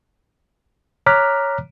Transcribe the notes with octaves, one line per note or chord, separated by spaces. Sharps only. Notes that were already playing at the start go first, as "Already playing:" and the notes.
C#5 A#5 D6 F6 F#6 B6